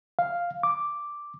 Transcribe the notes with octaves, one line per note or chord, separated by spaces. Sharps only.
F5
D6